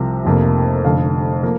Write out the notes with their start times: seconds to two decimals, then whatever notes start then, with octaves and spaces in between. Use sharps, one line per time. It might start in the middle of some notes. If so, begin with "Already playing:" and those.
Already playing: C2 C3 F3
0.25 F1 F2 C3 A#3
0.84 F1 F2 D3 F5
1.43 F3 A#3